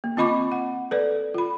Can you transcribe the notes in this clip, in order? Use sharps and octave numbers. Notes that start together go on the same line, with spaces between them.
A#3
C4 F4 D#5 B5 C#6 D6
F#5
A4 B4 D5
F4 B5